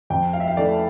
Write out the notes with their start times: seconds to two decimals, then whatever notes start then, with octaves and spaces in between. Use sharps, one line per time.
0.10 F2 G5
0.33 F5
0.40 E5
0.48 F5
0.57 E3 A3 E4 A4 D5